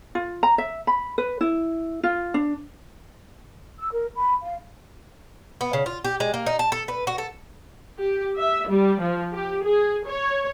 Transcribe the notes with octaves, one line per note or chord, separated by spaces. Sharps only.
F4
A#5
E5
B5
B4
E4
F4
D4
E6
A#4
B5
F5
B3
C#3
F4
G4
G#3
A#3
D#4
A5
A4
B4
F#4
A4
G4
E5
G3
F3
G4
G#4
C#5